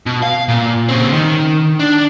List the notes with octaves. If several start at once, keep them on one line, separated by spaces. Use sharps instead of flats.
B2
F5
A#2
C#3 C4
D#3
D4